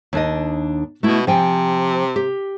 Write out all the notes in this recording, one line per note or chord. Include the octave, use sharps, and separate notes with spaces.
D#2 D4 D#5
B2 A3 E4
C3 F3 G5 G#5
G4